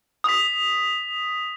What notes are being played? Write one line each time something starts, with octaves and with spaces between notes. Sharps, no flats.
D#6 B6